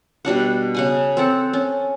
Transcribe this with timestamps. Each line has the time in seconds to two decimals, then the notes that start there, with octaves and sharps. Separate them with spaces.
0.25 B2 G3 D4 F#5
0.75 C#3 F#5 G#5
1.17 C4 A4 F#5
1.53 C#4